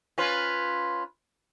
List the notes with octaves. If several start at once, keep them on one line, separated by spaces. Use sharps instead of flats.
C#4 F4 B4